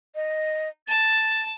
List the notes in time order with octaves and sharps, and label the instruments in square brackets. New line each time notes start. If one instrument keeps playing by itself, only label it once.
[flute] D#5
[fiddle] A5 [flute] A6